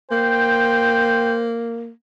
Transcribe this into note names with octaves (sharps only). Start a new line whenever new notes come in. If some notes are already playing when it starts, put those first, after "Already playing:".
A#3 C5 G5